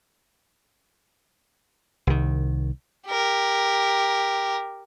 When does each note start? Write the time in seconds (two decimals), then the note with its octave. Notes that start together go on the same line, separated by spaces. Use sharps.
2.07 C2 D#3
3.08 G4 A#4